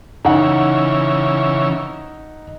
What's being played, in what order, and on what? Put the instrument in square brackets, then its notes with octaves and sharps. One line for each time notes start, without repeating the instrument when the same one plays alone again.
[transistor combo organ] C#3 E3 [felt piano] D#4 F#5